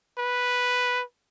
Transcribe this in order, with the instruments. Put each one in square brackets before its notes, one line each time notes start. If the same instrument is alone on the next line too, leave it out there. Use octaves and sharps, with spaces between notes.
[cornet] B4